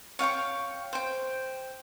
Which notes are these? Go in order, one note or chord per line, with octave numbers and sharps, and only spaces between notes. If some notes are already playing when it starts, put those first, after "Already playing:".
C#5 F5 G5 C#6
C5 G5